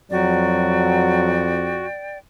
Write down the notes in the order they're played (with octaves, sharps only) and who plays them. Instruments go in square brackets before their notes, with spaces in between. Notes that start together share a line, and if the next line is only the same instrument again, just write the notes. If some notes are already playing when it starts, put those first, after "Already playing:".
[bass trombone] F2 [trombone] F#3 [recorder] F#4 [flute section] D5 G5